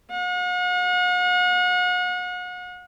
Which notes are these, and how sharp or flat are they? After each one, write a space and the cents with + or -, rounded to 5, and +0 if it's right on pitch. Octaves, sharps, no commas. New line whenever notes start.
F#5 -40